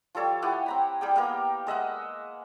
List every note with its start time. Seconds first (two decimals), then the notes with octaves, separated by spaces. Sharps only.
0.15 F3 G3 A4 C#5
0.42 E4 G4 F#5 G#5
0.66 C4 A#5 B5
1.01 G3 G#4 G5
1.16 A#3 B3 G4 A#4
1.67 G#3 D#5 E5 F#5